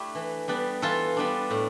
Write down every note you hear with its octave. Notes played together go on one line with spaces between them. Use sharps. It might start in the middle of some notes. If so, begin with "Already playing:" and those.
Already playing: A3 D4 E4 G4
E3
G3 B3 D4
E3 F4 A4
G3 B3 D4
A2